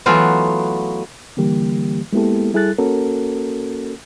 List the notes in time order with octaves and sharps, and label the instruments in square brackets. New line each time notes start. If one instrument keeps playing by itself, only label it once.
[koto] E3 F#3 A3 B3 F4 F#4
[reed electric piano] D3 E3 G3 A#3 G4
G#3 A#3 B3 E4 G4 A4
G3 E4 G#4 A4 F#6 A6
A#3 C#4 F#4 A4 A#4